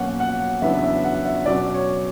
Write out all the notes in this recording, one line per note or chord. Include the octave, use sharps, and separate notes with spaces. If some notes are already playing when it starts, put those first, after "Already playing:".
Already playing: B2 F#3 A#3 C#4 F#5
F#5
E2 C#3 F#3 B3 D4 E5
E5
F#5
E5
B2 F#3 C#4 D5
C#5